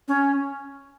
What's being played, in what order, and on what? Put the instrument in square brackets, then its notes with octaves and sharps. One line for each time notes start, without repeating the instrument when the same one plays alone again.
[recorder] C#4